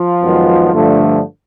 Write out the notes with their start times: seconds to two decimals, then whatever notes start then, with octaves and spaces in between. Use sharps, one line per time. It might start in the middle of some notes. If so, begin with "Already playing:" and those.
Already playing: F3 F4
0.23 F#2 D#3 G#3 B3
0.72 G2 D3 F3 A3